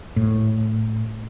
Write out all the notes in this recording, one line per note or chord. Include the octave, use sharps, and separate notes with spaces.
A2